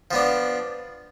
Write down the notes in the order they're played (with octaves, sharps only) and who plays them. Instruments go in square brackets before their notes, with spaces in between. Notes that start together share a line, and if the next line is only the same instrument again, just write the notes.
[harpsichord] F3 B3 D4